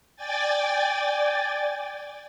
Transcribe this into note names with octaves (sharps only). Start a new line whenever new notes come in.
D5 G5 G#5 A6